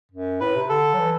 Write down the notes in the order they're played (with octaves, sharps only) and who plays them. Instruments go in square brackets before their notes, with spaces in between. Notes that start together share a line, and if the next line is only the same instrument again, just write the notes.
[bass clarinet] F#2
[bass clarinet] A2 [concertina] B4
[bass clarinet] C3
[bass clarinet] D3 [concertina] A4
[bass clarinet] F#3
E3